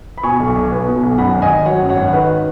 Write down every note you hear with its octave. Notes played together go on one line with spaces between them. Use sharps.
B5
B2 G#5 C#6
B1
B1
B3
B2
B1
F#2 F#5 B5
G#1
D#5 G#5
G#1
F#3 C#5 F#5
F#2
C#5 F#5
G#1
F#5
D#3 B4 D#5